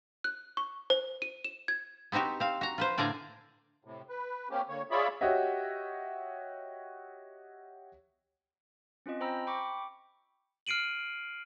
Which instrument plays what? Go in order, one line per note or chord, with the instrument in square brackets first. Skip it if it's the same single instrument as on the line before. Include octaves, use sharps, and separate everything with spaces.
[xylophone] F#6
C#6
C5
D#7
E7
G#6
[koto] B3 C4 D#4 F#4 G4
C4 F5
F#4 A#5
F4 B4 C5
A2 D3 D5 F5 G#5 A#5
[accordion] A2 C3
B4
A#3 C4 C#4 G4
D3 A#3 C#5
F4 G#4 C#5 D5 E5 B5
[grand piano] F#4 G4 C#5 D#5 E5
[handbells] C4 C#4 F4 D#5
C5 G5 A#5 B5 E6 A#6
G5 B5 C#6 D6
[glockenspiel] F6 C7 D7 D#7 F#7